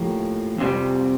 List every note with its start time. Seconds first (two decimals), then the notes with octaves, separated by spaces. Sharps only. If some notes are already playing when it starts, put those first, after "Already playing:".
Already playing: A2 F3 A#3 G4
0.58 F2 C3 E3 G3